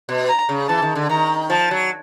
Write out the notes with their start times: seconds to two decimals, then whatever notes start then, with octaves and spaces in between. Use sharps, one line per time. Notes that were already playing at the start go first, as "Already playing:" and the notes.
0.09 B2
0.29 A#5
0.49 C#3
0.69 E3 A5
0.82 D#3
0.96 D3
1.09 D#3 A#5
1.50 F3 A5
1.71 F#3